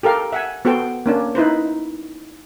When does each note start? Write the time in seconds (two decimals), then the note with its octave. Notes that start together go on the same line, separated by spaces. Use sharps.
0.03 G4 A4 A#4 F5 G5
0.32 E5 F#5 G#5
0.65 B3 F#4 A4 C5 G5
1.06 A#3 C#4 D4
1.35 D#4 E4 B4 C5